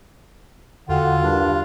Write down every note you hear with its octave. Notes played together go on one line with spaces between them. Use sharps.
E2 D3 F4 F#4 A4 F#5 G5
C2 G2 D4